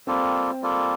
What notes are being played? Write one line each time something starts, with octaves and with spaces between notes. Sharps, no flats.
G3 A#3 C4 F4 A4
G3 A#3 F4 A4